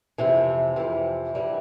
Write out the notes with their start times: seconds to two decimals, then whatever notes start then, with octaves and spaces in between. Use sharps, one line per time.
0.18 F2 C3 E3
0.76 F2 C3 E3
1.35 G2 E3 G3